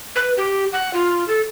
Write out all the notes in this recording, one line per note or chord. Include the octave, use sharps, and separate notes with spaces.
B4
G4
F#5
F4
A4